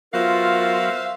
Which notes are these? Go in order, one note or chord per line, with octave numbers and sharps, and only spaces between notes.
F#3 B3 F4 F#4 A#4 C5 E5 F5